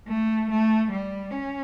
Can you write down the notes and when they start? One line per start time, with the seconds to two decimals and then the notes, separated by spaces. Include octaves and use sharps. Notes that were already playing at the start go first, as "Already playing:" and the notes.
0.08 A3
0.50 A3
0.91 G3
1.32 C#4